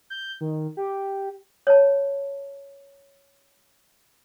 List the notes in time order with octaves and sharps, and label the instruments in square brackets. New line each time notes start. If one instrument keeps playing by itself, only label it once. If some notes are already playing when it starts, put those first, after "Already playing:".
[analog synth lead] G6
D#3
G4
[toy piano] C#5 A5